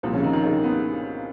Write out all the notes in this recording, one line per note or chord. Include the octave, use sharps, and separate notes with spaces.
C2 A#2 F3 C4
C#3 C#4
D#3 D#4
D#3 D#4
C#3 C#4
B3